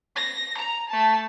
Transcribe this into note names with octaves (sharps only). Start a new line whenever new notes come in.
A#6
A#5
A3 A5